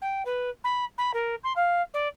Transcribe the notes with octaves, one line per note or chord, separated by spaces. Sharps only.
G5
B4
B5
B5
A#4
C6
F5
D5